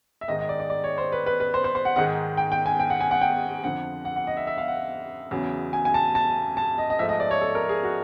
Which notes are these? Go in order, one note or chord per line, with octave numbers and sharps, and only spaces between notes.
E5
G#2 D#3 G#3 D#5
D#5
D5
D5
D5
C#5
C5
B4
B4
B4
C5
C5
C5
F#5
G#2 D#3 G#3 F#5
G5
G5
G#5
G5
F#5
G#5
F#5
G5
F2 D3 F3 F#5
F#5
F#5
D#5
E5
E5
F5
F#5
E2 C#3 F#3
G#5
G#5
A5
A5
A5
D#5
D#5
G#2 F3 A3 E5
D#5
D5
C#5
A4
A#4
G#4
F#4